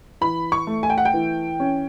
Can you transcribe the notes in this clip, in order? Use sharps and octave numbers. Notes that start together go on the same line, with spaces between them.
E3 B5
C#6
A3
G#5
G5
F#5
G5
E3
C#4